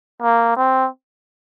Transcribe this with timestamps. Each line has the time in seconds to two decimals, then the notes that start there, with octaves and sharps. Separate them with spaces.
0.22 A#3
0.56 C4